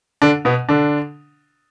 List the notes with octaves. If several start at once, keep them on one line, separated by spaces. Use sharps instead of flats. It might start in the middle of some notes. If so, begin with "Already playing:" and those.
D3 D4
B2 B3
D3 D4